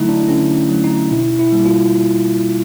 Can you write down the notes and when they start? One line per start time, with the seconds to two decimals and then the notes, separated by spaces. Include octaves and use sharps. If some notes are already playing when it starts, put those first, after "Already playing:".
Already playing: D3 F#3 A3 D#4 E4
0.09 D4
0.28 D3 C#4
0.70 F#3 A3
0.84 D#4
1.11 B2 E4
1.39 E4
1.52 G3 A#3
1.66 F4